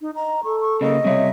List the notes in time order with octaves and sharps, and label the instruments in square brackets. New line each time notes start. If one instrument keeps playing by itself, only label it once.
[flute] D#4
[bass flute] D#5 [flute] A#5
[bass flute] A4 [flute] C#6
[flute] C#6
[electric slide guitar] C#3 A#3 [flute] D#5
[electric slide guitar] C3 G3 E5 [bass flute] C#5